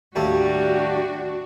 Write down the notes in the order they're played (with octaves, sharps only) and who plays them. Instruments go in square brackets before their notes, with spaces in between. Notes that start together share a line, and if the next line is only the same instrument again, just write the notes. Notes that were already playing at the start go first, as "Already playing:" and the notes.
[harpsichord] D#2 A2 A3 [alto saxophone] G3 [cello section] D4 F#4